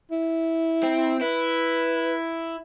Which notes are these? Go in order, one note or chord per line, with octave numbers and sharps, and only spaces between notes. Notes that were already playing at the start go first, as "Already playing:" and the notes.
E4
C4
E4 B4